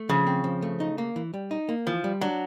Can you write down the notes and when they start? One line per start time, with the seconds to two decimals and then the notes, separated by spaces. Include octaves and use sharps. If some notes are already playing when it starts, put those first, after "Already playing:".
Already playing: A3
0.09 C#3 F3
0.27 C4
0.44 F3
0.62 A3
0.80 D#4
0.98 A#3
1.16 E3
1.34 G3
1.51 D#4
1.69 A#3
1.86 E3 F3
2.04 G3
2.21 F#3 D4